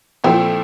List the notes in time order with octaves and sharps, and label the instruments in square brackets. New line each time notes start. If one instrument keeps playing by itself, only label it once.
[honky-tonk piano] A#2 F3 A3 E4 [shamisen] C4